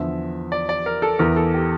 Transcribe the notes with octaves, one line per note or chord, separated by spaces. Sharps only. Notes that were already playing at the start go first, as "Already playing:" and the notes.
Already playing: E2 D3 F3 E5
D5
D5
A#4
A4
E2 E3 A#4
A4
G4